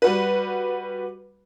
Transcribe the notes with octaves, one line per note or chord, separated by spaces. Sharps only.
G3 F#4 B4